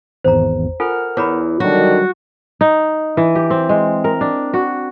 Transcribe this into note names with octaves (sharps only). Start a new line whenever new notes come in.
G#1 E2 C5 A#5
F4 A4 A#4 F#5 G#5 F6
E2 C#5 A#5 B5
D3 D#3 F#3 G3 D4 F#4
D#4
E3
G4
C4
G#3
A#4
D4
F#4